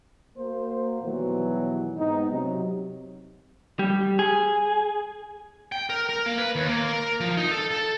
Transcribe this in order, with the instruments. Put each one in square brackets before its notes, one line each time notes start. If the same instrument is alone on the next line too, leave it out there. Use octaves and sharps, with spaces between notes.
[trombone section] A#3 F#4 C5
B2 D#3 E3 F#3 G3
G#2 B3 C4 D#4
C3 F#3
[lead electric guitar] G3
G#4
G5
A#4
A#4
A#3
B4
D#2
A#3
A#4
F3
D#4
A4
A4